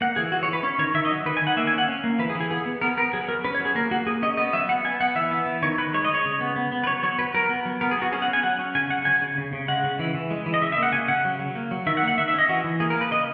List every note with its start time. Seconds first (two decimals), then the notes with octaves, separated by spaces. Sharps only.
0.01 A#3 F#5
0.16 E3 G#4
0.32 E3 F#4
0.43 C#5
0.48 E3
0.53 B4
0.63 C#4 C#5
0.79 D#3 C#5
0.94 D#3 E5
1.05 D#5
1.10 F#3
1.26 D#3 B4
1.37 G#5
1.42 D#3
1.47 F#5
1.57 A#3 E5
1.67 G#5
1.73 C#4
1.78 F#5
1.88 C#4
2.04 A#3
2.19 E3 B4
2.30 G#4
2.35 E3
2.40 G#4
2.51 B3 G#4
2.66 B3
2.81 B3 A#4
2.97 B3 A#4
3.13 F#3 G#4
3.28 F#3 A#4
3.44 C#4 B4
3.55 C#5
3.59 F#3
3.65 G#4
3.75 A#3 A#4
3.91 A#3 F#4
4.06 A#3 G#4
4.22 C#4 D#5
4.37 B3 D#5
4.53 F#3 E5
4.69 B3 F#5
4.84 B3 G#5
5.00 B3 F#5
5.15 E3 E5
5.31 B3
5.46 E3
5.62 D#3 C#5
5.78 D#3 B4
5.94 G#3 C#5
6.05 D#5
6.09 G#3 C#5
6.25 C#3
6.41 B3
6.56 B3
6.72 B3
6.84 B4
6.87 F#3 C#5
7.03 F#3 C#5
7.19 F#3 B4
7.34 F#3 A#4
7.49 B3
7.65 F#3
7.81 B3 A#4
7.91 G#4
7.97 B3 F#4
8.12 C#4 G#4
8.22 F#5
8.28 C#4
8.33 G#5
8.43 F#3 F#5
8.59 C#4
8.75 C#3 G#5
8.90 C#3 F#5
9.05 F#3 G#5
9.22 C#3
9.38 C#3
9.53 C#3
9.68 G#3 F#5
9.84 C#3
9.99 E3
10.15 E3
10.31 G#3
10.46 E3
10.54 D#5
10.62 C#3 E5
10.72 E5
10.77 A#3
10.83 F#5
10.93 C#3 G#5
11.08 C#3 F#5
11.25 F#3
11.39 F#3
11.55 A#3
11.71 F#3
11.86 D#3 E5
11.97 F#5
12.03 A#3
12.08 F#5
12.18 D#3 E5
12.28 E5
12.34 C#4 D#5
12.49 E3 F#4
12.64 E3
12.80 A#3 G#4
12.90 A#4
12.96 A#3
13.01 B4
13.11 C#3 D#5